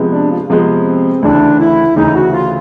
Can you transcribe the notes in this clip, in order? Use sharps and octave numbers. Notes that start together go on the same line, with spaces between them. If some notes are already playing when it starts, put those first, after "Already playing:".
Already playing: C3 F3 G#3 B3
D4
F4
C3 F3 G#3 B3 C4
D2 C#3 E3 D4
E4
D2 C#3 E3 D#4
F#4
F4